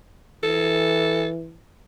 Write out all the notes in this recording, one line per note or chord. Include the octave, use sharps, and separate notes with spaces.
E3 A4